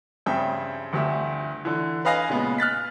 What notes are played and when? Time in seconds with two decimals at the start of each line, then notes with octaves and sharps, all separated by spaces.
0.26 G2 C#3 C4 G#4 E5 G5
0.93 G1 D2 G4 E5
1.65 D3 E3
2.05 B4 D#5 F5 G#5 A#6
2.29 A#2 C#3 G#3 B3
2.58 F6 F#6 A6 B6